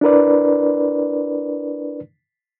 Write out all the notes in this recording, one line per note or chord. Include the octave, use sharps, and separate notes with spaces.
D4 E4 A#4 B4 D5